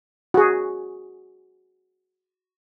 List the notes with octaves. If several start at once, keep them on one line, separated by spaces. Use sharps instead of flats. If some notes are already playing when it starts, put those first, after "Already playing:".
F#4 G#4